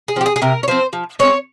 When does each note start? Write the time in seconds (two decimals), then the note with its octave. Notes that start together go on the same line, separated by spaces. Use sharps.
0.08 G#4
0.16 F3 C4 G4
0.26 G#4
0.36 G#4
0.42 C3 A#4
0.63 C#5
0.68 F3 C4 C5
0.93 F3
1.19 G#3 C4 C#5